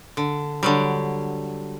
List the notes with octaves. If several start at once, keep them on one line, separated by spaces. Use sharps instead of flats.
D3
D3 F#3 G3